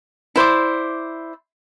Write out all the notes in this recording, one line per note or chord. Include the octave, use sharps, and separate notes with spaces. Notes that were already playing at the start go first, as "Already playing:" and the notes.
E4 C5 D5 D6